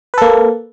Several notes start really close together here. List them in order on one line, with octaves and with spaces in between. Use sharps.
B4 A4 A#3